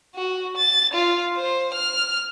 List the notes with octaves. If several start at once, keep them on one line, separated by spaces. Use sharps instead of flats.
F#4
A6
F4
C5
F6